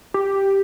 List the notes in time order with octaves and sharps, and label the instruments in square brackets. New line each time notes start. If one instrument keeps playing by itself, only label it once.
[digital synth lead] G4